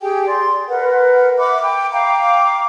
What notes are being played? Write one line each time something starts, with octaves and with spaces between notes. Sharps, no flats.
G4 G#4 G5 G#5
D5 C6
A#4 B4 F#5
E5 F#5 B5 D6
G5
F5 G5 A#5 D6